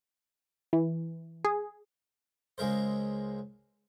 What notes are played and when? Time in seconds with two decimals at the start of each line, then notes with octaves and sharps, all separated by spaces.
0.73 E3
1.45 G#4
2.58 C#2 G#3 A#4 C5